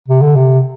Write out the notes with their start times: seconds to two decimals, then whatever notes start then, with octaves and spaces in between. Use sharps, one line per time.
0.08 C3
0.22 D3
0.36 C3